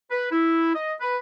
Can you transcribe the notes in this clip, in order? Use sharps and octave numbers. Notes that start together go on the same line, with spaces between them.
B4
E4
D#5
B4